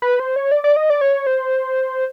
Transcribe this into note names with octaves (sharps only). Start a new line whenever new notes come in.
B4
C5
C#5
D5
D5
D#5
D5
C#5
C5